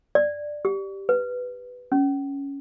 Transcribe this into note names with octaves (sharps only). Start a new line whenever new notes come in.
D5
G4
B4
C#4